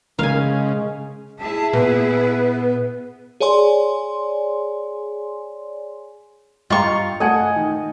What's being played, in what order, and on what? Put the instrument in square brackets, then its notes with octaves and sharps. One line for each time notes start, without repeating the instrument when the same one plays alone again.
[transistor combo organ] C#3 [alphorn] G#3 [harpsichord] A#4 [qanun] F5 G#5
[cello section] E4 G#4 E5 [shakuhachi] A5
[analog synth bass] A#2 [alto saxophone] B3 [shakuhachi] B4
[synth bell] G#4 C#5 D5 G#5 C6
[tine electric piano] G2 A6 [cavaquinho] F4 C#6 [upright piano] D#5 G5 A#5
[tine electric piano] A3 [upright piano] A4 F#5 C#7 [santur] D#5 G#5
[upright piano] D#3